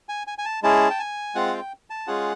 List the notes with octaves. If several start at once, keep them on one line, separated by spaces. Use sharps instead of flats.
G#5
G#5
G#5
A5
G#3 C#4 E4 G#4 A5
G5
G#5
G#3 C4 F4 F#5
G5
A5
G#3 C#4 F4 G#4 F#5